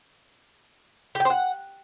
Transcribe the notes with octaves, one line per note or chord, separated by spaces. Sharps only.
G4
G5
C5
F#5